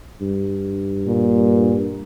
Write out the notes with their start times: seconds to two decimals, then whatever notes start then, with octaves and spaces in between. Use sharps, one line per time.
0.22 G2
1.07 A#2